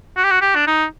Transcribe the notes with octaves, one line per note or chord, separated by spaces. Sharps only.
F#4
G4
F#4
G4
D4
D#4